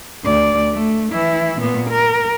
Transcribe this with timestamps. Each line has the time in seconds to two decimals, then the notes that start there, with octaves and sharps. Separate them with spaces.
0.24 D2 D5
0.73 A3
1.12 E3 E4
1.60 A#2 B3
1.90 A#4